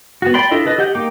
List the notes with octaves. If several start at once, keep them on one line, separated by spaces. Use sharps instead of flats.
B3 F#4
D5 G5 B5 C6
D4 E4 F4 A4 D#5
A4 B4 D#5
G4 D#5 F#5 G6
A#3 D#4 G5 D6